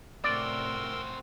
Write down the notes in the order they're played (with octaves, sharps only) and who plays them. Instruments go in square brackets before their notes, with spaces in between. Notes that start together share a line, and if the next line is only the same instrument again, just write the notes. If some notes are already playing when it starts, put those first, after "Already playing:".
[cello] A2 C3 [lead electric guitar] C4 F#4 [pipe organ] A#4 C6 E6 [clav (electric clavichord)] D5